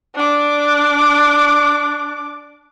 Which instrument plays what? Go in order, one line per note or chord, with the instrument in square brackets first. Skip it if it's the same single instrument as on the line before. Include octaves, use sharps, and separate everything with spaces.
[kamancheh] D4 D6